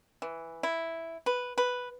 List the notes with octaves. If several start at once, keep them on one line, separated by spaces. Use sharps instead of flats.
E3
E4
B4
B4